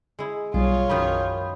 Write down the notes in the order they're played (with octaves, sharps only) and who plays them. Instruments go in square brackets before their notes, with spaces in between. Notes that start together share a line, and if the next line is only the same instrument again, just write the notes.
[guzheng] G#3 E4
[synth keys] B1 G3 [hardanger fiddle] F4 C#5 [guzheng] G#4
[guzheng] F#2 D#3 F3 [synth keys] B5 D#6 G6